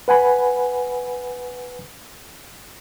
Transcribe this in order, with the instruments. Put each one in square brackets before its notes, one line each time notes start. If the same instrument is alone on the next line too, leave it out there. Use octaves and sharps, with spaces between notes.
[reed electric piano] B4 F#5 G#5 B5